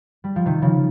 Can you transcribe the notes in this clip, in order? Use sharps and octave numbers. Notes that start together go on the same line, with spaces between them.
G3
F3
C3 D#3
C#3 F3